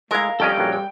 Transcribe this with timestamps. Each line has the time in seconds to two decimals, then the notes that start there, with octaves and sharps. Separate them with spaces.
0.11 G#3 A3 E4 A#4 F5
0.40 F2 G3 C#4 A4 D#5 G5 F6
0.58 A#1 F#2 F#3
0.73 G5